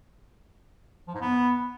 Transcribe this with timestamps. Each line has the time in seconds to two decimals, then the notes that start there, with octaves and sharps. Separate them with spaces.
1.08 F3
1.14 G#2
1.21 B3